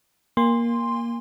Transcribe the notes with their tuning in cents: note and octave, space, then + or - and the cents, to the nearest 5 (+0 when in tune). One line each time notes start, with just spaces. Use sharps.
A#3 +10 G#5 -45 C6 +0